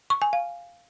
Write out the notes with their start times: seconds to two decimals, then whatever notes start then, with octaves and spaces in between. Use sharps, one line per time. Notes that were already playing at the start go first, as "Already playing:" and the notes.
0.10 C#6
0.22 G#5
0.33 F5